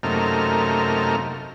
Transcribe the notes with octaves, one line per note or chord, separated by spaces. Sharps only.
F#2 C3 A3 A#3 D#4 F6